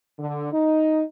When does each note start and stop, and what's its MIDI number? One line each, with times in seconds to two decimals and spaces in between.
0.18 0.51 50
0.52 1.02 63